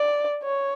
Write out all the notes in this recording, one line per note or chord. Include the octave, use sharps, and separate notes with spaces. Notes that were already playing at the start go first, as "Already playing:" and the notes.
Already playing: D5
C#5